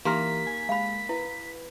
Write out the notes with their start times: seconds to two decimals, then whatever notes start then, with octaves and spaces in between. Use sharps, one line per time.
0.05 E3 A#3 D#4 G4 A#4 C6 B6
0.47 G#5
0.69 G#3 F5 B5
1.09 E4 B4